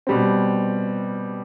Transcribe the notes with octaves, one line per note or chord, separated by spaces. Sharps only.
B2 G3 C4